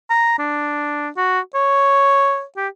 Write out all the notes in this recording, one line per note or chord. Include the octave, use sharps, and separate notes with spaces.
A#5
D4
F#4
C#5
G4